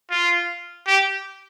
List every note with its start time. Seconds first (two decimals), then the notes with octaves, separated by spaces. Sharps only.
0.11 F4
0.87 G4